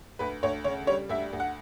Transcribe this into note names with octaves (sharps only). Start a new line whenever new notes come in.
D2 B4
D2 C#5
C#3 C#5
G3 C#5
D2 E5
D2
F#5